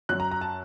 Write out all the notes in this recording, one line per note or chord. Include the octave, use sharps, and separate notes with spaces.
F#2 F#3 F#6
A#5
A#5
A5